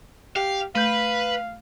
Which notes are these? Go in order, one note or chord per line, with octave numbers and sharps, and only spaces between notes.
G4 F5
A3 B4 F5 G6